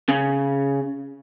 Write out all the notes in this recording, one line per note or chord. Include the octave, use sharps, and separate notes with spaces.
C#3